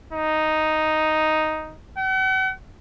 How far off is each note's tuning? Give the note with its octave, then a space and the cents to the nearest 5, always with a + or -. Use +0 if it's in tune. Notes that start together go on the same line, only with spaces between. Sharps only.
D#4 +0
F#5 +45